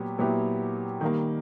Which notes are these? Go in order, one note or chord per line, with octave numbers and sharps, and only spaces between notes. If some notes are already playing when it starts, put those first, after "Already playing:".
Already playing: A#2 F#3 B3 G4
A#2 F#3 B3 E4 G4
D#3 G3 A#3